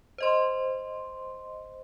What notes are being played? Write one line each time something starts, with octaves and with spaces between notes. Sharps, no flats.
C5 D#5 C6